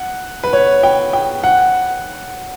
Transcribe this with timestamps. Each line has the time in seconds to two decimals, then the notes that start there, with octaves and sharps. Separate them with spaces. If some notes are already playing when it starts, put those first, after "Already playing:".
Already playing: F#5
0.43 B4
0.53 C#5
0.83 G5
1.13 G5
1.44 F#5